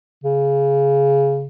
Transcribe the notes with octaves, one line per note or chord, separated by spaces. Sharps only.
C#3